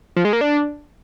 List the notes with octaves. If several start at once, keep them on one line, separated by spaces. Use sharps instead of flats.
F3
G#3
A#3
D4